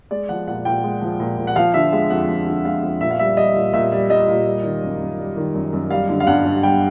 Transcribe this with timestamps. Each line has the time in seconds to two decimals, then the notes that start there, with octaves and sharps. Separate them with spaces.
0.11 G#3 D5
0.29 F3 F#5
0.48 A#2 F#5
0.65 A#2 G5
0.84 G#3
1.01 F3
1.20 A#2
1.38 A#2
1.47 F#5
1.56 F3 F5
1.74 D3 E5
1.92 G#3 F5
2.10 F2 F#5
2.28 F3
2.47 D3
2.65 G#3 F5
2.83 F2
3.01 A#2 E5
3.10 F5
3.19 G3 E5
3.37 G3 D#5
3.55 A#2
3.73 A#2 E5
3.92 G3
4.09 G3 D#5
4.28 A#2
4.46 G3
4.64 D#3
4.82 F#2
5.00 F#2
5.18 G3
5.36 D#3
5.54 F#2
5.73 F#2
5.91 G3 F5
6.09 D3
6.20 F5
6.27 G2 F#5
6.46 G2
6.63 G3 G5